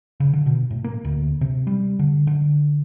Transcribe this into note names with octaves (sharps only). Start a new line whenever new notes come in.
C#3
D3
B2
A2
A#3
D2
C3
G3
D3
D3